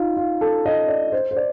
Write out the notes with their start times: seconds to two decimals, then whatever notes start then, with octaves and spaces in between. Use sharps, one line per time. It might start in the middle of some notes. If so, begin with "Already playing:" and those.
Already playing: D#4 F4
0.17 F4
0.41 A4
0.66 D#5
0.88 D5
1.12 C5
1.31 C5
1.37 D5